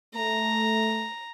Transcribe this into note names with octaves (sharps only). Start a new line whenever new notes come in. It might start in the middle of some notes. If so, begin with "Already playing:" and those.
A3 A#5